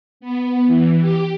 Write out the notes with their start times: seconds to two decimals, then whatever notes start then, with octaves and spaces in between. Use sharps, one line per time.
0.20 B3
0.66 E3
1.01 G4